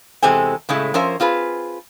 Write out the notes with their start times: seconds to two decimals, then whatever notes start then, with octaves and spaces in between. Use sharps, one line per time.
0.23 E2 C3 G#3 C4 A4 G#5
0.69 A2 C#3 G#3 A3 E4
0.94 F3 C#4 A#4 C5 E5
1.20 C4 F4 G#4 B4